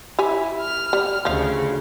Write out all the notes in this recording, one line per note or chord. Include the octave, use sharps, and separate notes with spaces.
E4 G4 C#5 G#5
F6
G3
D2 C#3 F3 F5